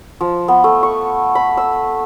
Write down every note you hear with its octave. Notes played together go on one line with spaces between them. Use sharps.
F3
B3
A3
C#6
B5
E6